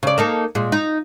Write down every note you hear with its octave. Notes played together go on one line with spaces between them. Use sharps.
C#3 D5
A#3 D#4 A4
A#2 G#3
D#4